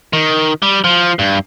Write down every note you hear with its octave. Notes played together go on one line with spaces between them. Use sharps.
D#3
G3
F3
G2